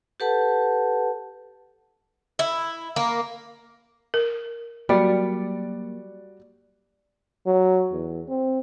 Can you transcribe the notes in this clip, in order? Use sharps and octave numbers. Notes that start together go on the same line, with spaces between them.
G4 A4 B4 F#5 A5
E4
A#3
A#4
F#3 G3 A#3 F#4 D5
F#3
E2
C4